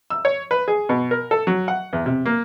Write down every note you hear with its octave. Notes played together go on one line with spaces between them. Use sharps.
E6
C#5
B4
G#4
B2
A#4
A4
F#3
F#5
E2
C3
A#3